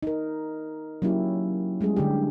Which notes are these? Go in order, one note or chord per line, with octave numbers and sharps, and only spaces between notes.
D#4 A#4
F#3 A#3 C#4 E4 G4
G3 G#3 C#4 G#4
D3 D4 G4